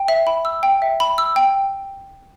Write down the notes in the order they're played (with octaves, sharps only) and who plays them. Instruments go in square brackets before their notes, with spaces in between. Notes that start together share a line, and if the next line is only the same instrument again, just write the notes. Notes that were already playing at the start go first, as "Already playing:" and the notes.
Already playing: [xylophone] G5
E5
B5
E6
G5
E5
B5
E6
G5